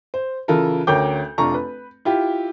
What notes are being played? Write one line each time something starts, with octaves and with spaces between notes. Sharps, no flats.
C5
C#3 E3 F4 A4 A#4
D2 C#4 A#4 G5 D6 G6
F1 D4 F4 A#5 C#6
B4
E4 F4 G4